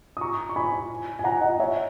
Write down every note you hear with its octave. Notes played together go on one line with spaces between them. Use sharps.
D#6
A#5 C#6
C#6
G#5 B5
G#5
F#5 A#5
D#5 F#5
C#5 E5